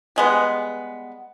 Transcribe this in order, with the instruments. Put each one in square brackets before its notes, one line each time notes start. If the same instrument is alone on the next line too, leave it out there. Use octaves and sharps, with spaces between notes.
[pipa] G3 G#3 B3